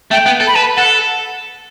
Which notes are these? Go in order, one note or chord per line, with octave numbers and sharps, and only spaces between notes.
A3 G5
B3
A4
B5
B4 A5
A4 F#5